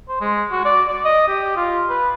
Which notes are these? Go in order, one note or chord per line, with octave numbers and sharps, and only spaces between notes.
C5
G#3
F#4
D5
D5
D#5
G4
F4
B4